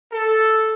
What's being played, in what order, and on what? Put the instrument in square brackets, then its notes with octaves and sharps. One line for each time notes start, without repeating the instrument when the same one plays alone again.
[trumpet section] A4